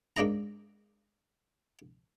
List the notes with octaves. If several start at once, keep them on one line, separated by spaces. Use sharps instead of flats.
G#2 A#3 D4 D#5 A#5